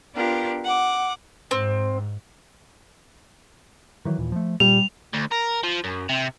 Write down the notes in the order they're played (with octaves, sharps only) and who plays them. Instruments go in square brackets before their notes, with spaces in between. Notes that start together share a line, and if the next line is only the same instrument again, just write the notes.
[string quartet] B3 D4 F4 G4 A#4
F#5 D6
[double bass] G#2 [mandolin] C4
[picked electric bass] D#3 E3 F#3
D#2 A#2 E3
F3 A3
[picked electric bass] A#2 [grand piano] G3 [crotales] F7
[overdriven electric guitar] D2
A#4
F3
F#2
C3